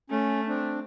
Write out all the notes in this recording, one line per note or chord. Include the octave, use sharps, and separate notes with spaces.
A3 C#4
C4 D4